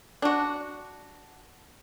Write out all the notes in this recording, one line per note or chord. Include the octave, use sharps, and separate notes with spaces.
D4 F#4